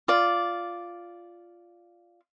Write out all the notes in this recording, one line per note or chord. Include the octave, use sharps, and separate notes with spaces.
F4 D5